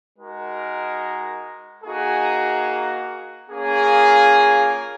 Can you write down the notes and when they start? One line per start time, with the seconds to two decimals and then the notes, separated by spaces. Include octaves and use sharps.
0.18 G#3 D#4 F#4 A#4
1.84 A#3 D#4 F#4 G#4
3.50 A#3 C#4 F4 G#4